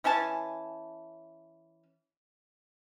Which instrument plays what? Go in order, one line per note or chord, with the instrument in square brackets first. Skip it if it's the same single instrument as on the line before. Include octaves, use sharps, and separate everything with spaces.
[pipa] E3 C#4 G#5 A5